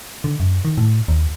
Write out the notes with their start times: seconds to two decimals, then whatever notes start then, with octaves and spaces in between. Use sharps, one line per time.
0.24 D3
0.40 F#2
0.65 D#3
0.78 A2
1.08 D#2